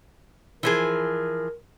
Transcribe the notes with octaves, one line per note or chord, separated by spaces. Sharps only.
E3 F3 G#4 A#4